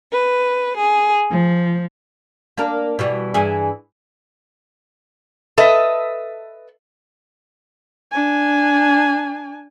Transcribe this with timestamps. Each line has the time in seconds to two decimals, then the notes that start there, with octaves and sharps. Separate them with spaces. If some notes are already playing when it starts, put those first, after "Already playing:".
0.11 B4
0.77 G#4
1.30 F3
2.57 A#3 D4 A#4
2.99 B2 E3 G3
3.34 G2 E3 G#4
5.58 A4 B4 D#5 E5
8.11 D4 G#5